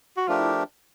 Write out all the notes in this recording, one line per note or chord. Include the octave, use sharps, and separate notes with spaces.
F#4
F3 A3 D4 F4 G4 A#4
E4